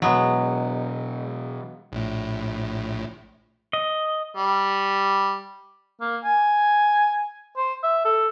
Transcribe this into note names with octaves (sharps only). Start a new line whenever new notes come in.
B2 E3 F#3 G#3 B3
A#1 A2
D#5
G3
A#3
G#5
C5
E5
A4